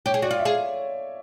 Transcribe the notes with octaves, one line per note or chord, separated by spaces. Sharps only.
G4 C#5
G#4
F#4 D5
F4
E5
G#4